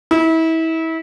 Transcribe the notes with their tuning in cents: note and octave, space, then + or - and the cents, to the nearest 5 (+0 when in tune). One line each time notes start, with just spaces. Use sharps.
E4 -30